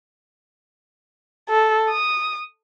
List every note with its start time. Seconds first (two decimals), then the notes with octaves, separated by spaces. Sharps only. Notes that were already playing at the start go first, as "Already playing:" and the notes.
1.49 A4
1.89 D#6